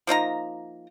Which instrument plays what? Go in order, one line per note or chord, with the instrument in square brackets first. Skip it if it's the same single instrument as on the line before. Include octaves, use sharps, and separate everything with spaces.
[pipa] F3 A#3 D#4 A#5